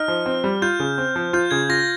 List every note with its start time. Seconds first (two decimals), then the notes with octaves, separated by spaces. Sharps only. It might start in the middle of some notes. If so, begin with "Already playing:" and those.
Already playing: D#4 F6
0.08 F3
0.26 C4
0.44 G3
0.62 F4 G6
0.80 C#3
0.98 C4
1.16 F3
1.33 F4 G6
1.51 C#3 G#6
1.69 F4 A#6